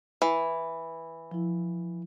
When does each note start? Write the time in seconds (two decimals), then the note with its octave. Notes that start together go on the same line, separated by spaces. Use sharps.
0.22 E3
1.31 F3 E4